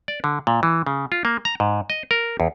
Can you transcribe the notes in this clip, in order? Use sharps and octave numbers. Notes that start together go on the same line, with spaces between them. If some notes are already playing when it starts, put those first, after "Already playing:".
D5
D3
A#2
E3
C#3
F4
A#3
A#5
G#2
D#5
A#4
E2